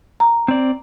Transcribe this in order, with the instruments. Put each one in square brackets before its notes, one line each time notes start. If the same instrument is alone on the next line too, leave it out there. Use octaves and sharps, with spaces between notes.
[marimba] A#5
[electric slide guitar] C4 D5